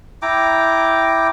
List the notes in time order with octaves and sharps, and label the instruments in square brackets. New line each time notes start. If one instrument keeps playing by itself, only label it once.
[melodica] E4 G5 A#5 D6